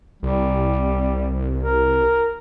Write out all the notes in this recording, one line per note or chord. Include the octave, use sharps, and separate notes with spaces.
C2 G3
A#4